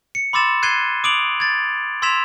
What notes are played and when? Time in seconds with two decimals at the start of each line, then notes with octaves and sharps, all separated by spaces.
0.15 C#7
0.33 B5 C6 D6 E6 A6 E7
0.62 F#6 G#6 C7 D#7 G7
1.04 D6 D#6 D7 F7 F#7
1.40 G#6 A6
2.02 C6 E6 G#6 B6 E7 F7